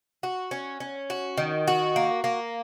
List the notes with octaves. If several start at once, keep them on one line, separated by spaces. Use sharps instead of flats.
F#4
C#4
C#4
F#4
D#3
F#4
A#3
A#3